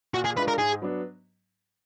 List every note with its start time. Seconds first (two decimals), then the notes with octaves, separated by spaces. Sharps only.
0.14 A#2 F#4
0.25 G#4
0.36 G#3 D4 F4 B4
0.48 A#4
0.58 G#2 G#4
0.82 F#3 B3 D4